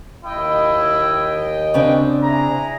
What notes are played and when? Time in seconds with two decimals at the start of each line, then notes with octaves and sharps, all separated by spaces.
0.25 D#2 E4 D#5 G5
1.74 C#3 C4 D4
2.23 E4 G#4 A#5